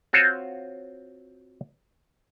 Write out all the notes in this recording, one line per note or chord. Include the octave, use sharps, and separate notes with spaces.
C4 F4 F#4 C5 C#5